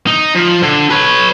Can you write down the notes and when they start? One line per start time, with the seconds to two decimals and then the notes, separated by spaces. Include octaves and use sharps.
0.07 D#4
0.35 F3
0.63 D3
0.90 B4 C#5